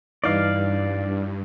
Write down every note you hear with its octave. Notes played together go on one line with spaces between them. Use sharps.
G2 E3 D#4 D5 F5